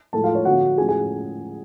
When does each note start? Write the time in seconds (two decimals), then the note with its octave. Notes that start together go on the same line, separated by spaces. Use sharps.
0.13 A2 F3 G#3 A4 A5
0.24 F4 F5
0.35 C#5
0.45 D3 F3 B3 F#4 F#5
0.78 A2 F3 G#3 C#4 G#4 G#5
0.89 G#4 G#5